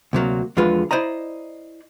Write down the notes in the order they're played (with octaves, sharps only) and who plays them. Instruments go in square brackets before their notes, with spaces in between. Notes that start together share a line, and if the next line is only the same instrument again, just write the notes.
[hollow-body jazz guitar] D2 C3 F#3 A#3
E2 D3 F3 G#3 F4 B4
E4 C5 D5 D#5 A#5